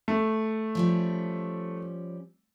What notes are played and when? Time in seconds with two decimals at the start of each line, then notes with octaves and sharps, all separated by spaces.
0.08 A3
0.75 F3 G3 C#4